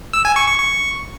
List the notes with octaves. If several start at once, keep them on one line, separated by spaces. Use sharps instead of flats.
E6
G#5
C#6
C#6
C#6